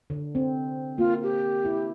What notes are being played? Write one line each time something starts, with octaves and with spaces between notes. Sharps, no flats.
D3
C4
A#3 F4
G4
E4